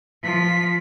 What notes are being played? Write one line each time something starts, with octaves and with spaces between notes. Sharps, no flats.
F3 B6